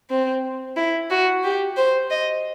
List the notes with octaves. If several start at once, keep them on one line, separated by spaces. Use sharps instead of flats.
C4
E4
F#4
G4
C5
D#5